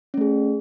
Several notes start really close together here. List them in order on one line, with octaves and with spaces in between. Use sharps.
C#4 A3 G#4